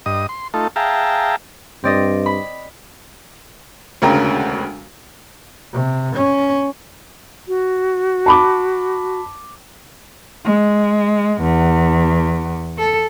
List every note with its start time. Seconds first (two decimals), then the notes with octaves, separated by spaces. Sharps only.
0.06 G2 D#5 D#6
0.29 C6
0.54 A3 D#4 F4 A4
0.76 G#4 E5 F5 G5 A5 A#5
1.84 G2 C4 D5 D#5
2.26 B5
4.02 E1 D2 C#3 A#4 G5
5.73 C3
6.15 C#4
7.48 F#4
8.26 A5 B5 D6
10.45 G#3
11.42 E2
12.78 A4